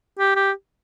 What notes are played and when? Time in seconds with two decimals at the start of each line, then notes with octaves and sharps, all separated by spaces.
0.18 G4
0.36 G4